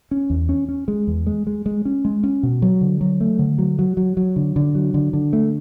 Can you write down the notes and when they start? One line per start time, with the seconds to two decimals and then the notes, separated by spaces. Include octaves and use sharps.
0.11 C#4
0.30 E2
0.49 C#4
0.69 C#4
0.88 G#3
1.07 E2
1.27 G#3
1.47 G#3
1.66 G#3
1.85 C#4
2.05 G#3
2.23 C#4
2.43 B2
2.62 F#3
2.81 D3
3.01 F#3
3.21 A3
3.39 D3
3.58 F#3
3.79 F#3
3.97 F#3
4.17 F#3
4.36 D3
4.56 D3
4.75 F#3
4.94 D3
5.13 D3
5.33 A3